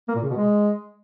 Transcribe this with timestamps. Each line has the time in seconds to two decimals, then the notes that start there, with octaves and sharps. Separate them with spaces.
0.08 A#3
0.15 A#2
0.23 C#3
0.30 B2
0.37 G#3